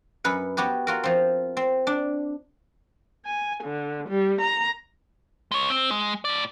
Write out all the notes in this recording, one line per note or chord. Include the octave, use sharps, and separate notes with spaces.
F#2 B4 F#5
B3 F#4 G4 B4
F4 F#4 A#4
F3 C4
C4
D4
G#5
D3
G3
A#5
G#3 C#5
C4
G#3
A2 D5